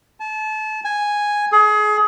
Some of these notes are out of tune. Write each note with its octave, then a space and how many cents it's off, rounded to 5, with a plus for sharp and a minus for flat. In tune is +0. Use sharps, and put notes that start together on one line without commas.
A5 -30
G#5 -5
G#4 +30